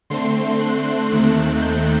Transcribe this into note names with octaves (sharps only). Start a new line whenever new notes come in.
D3 A3 C4 C6
F#6
D#2 D#3 A3 C4
G6